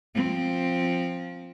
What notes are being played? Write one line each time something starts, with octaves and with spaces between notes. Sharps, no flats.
F3 C4